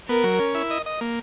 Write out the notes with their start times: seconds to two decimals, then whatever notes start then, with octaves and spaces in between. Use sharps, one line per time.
0.08 B3 A#4
0.24 F#3
0.39 C#4
0.55 E4
0.70 D#5
0.86 D#5
1.01 A#3